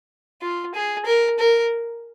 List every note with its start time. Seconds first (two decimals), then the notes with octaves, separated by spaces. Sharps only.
0.42 F4
0.75 G#4
1.06 A#4
1.39 A#4